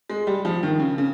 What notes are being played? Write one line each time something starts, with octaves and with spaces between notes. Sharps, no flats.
G#3
G3
F3
D#3
C#3
C#3